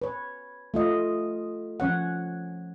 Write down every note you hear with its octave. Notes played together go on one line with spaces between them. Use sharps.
B4 C#5
A3 F4 D#5
F3 C#4 C#5 F#5